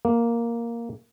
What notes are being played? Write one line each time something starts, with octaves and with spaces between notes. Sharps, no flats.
A#3